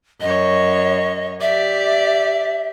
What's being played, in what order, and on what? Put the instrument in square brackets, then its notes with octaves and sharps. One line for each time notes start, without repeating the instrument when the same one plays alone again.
[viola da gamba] F#2 C#5 [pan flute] D#5
[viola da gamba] G4 D5 [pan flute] E5